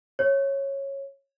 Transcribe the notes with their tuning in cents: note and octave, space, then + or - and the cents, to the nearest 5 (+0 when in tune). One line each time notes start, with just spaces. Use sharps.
C#5 -15